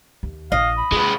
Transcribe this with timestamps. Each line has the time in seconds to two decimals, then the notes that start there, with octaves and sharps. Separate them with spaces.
0.23 D#2
0.52 A#1 D#5 F5
0.78 B5
0.92 G#3 F4 B4